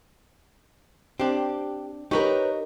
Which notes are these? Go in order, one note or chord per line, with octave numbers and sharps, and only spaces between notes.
C4 D4 G4
D#4 G4 A#4 B4 C#5